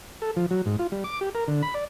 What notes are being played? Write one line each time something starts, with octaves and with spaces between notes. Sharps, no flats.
A4
F3
F#3
G#2
F4
G3
D6
G4
A#4
D3
B5
D5